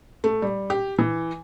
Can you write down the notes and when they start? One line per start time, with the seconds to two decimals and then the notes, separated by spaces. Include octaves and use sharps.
0.24 A3
0.42 G3
0.70 G4
0.99 E3